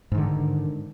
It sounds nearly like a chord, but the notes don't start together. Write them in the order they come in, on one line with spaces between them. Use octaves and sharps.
G#2 D#3 D3